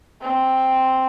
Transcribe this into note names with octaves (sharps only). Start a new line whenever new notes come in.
C4